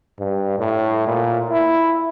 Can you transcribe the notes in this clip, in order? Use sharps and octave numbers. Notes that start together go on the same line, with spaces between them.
G2
A2
A#2
E4